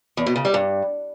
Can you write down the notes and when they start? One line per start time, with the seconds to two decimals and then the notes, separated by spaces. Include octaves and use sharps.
0.17 E2
0.26 B2
0.36 C#3
0.45 G3
0.54 G2